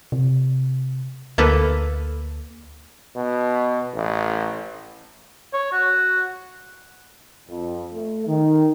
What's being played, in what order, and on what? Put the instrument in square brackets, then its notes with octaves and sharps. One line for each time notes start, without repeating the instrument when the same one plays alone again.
[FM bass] C3
[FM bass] D2 [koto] A#3 A4 B4
[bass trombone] B2
A1
[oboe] C#5
F#4
[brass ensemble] F2
A3
D#3